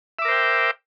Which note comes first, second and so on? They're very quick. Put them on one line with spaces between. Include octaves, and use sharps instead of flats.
E5 D6 A#4 C5 G5